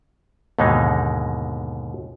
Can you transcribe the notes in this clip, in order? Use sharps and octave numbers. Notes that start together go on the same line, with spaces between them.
D#2 G#2 B2 D3 G#3 D#4